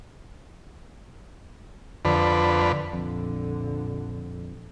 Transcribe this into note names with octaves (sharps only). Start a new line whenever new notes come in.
F2 D3 B4
A#1 F2 D3